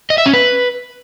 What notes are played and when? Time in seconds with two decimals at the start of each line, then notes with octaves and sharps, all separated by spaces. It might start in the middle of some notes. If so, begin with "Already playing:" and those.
0.10 D#5
0.18 E5
0.26 C#4
0.33 B4